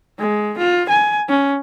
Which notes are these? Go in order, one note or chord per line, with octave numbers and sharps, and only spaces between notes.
G#3
F4
G#5
C#4